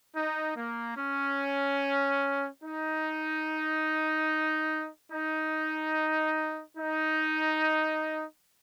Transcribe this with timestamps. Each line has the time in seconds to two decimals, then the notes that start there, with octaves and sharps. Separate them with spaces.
0.15 D#4
0.57 A#3
0.97 C#4
2.63 D#4
5.11 D#4
6.77 D#4